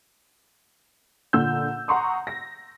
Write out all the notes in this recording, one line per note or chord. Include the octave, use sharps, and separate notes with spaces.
A#2 D3 E6 G6
F#5 A#5 C6 C#6 D#6
A#6